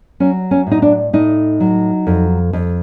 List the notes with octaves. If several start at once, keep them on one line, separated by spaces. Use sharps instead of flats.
F#3 C#4
C#4
A2 D#4
D4
A2 D#4
F#3
F2
F2